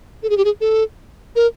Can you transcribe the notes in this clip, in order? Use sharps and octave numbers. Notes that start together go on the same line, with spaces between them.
A4
G#4
G4
G#4
A4
A#4